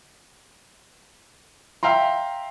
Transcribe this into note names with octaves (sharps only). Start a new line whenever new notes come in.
E5 F5 G5 A#5 C6